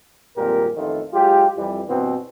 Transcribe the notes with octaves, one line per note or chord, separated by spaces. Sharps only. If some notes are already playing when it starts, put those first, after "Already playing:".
G#1 F2 A#2 G3 G4 A#4
A1 F2 D#3 A3 F4 A4
F#3 G#3 F4 G4
F2 E3 G3
G2 B2 E3 B3 C4